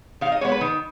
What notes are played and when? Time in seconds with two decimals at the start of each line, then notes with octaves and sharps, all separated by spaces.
0.21 D#3 F5
0.32 D#5
0.41 G#3 B3 C#5
0.52 B4
0.61 D#3